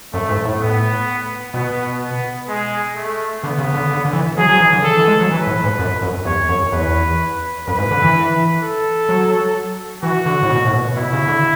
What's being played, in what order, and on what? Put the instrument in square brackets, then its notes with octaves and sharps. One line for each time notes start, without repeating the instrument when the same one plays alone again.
[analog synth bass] F#2 [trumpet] A3
[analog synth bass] G#2
A2
[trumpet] B3
[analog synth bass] B2 [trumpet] B3
[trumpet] B3
G#3
A3
[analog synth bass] D3 [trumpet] B3
[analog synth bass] C#3
D3
D3
D3
E3
[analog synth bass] F#3 [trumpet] G#4
[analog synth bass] F#3
E3
D3
[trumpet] A4
[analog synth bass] E3
G#3
F#3
[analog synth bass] E3 [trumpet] B4
[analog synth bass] A2
G#2
F#2
F#2
[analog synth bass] E2 [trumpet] C#5
[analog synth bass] F#2
[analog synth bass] E2 [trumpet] B4
[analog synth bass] F#2 [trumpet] B4
[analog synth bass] G#2
D3
E3
[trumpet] A4
[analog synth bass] F#3
[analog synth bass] E3 [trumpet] F#4
[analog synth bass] D3
A2
B2
A2
B2
[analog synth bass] B2 [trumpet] E4
[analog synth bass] C#3
D3